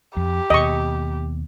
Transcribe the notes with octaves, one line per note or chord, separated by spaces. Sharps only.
F2 G4
D#2 B2 D#5 C#6